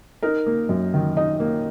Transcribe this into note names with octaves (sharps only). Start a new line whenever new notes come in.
D#4 A#4
A#3
F#2
D#3
D#4 D#5
A#3